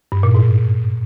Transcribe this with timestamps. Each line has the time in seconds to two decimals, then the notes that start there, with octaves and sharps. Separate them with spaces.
0.12 G2
0.23 A#2
0.35 G#2